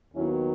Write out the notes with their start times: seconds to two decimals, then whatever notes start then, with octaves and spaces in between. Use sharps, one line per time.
0.14 D#2 D#3 F#3 B3 C#4 E4